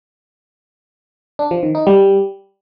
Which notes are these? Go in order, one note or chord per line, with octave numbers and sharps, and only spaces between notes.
D4
F3
D#3
D#4
G3